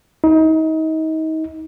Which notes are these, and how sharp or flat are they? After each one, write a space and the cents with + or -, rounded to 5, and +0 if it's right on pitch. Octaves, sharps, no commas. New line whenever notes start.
D#4 +30